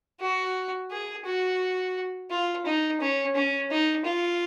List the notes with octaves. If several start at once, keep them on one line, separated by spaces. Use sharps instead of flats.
F#4
G#4
F#4
F4
D#4
C#4
C#4
D#4
F4